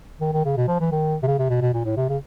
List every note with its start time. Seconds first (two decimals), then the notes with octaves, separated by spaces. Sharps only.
0.21 D#3
0.33 D#3
0.45 C#3
0.57 B2
0.68 F3
0.80 E3
0.92 D#3
1.23 C3
1.27 C#3
1.39 C3
1.50 B2
1.61 B2
1.74 A#2
1.85 A2
1.97 C3
2.09 C#3